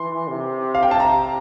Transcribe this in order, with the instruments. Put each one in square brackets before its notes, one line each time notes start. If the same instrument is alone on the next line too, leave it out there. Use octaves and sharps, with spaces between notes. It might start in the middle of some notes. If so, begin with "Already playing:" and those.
Already playing: [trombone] E3 [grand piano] C6
[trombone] C3
[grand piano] F5
G5
A5
[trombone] C3 [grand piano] A#5